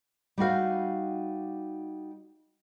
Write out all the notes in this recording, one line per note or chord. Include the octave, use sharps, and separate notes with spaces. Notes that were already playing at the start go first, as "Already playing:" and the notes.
G3 D#4 F#4 F5